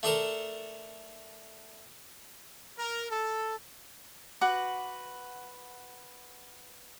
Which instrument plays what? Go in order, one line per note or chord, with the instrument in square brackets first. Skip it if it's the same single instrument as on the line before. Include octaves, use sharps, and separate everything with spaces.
[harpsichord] A3 D4 A4 A#4
[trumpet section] A#4
A4
[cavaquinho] F#4 B4 F#5 D6